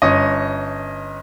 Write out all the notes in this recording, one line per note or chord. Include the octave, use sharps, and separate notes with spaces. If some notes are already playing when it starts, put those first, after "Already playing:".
G1 C#4 D#5